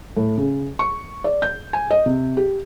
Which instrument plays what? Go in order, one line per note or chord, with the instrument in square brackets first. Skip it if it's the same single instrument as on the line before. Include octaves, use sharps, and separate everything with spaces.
[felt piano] A2
C#3
C#6
D5
G6
G#5
D#5
C3
G4